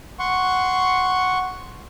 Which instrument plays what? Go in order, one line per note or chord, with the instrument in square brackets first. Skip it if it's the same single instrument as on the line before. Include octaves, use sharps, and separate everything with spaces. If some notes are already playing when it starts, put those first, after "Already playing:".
[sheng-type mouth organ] F#5 C6 C#6